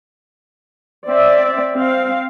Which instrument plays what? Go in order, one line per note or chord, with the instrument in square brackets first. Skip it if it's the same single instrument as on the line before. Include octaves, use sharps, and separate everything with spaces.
[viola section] C4 D5 E5
C4 F5